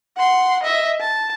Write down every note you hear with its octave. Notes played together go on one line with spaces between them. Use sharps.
F#5 C6
D#5 E5
A5